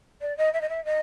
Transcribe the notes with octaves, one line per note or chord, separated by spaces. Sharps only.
D5
D#5
E5
D#5
E5
D#5